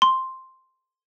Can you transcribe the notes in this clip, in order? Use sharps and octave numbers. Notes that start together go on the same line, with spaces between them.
C6